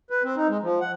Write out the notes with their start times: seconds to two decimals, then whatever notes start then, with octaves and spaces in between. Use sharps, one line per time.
0.10 B4
0.23 C4
0.36 D#4
0.49 G#3
0.63 F3
0.81 F#5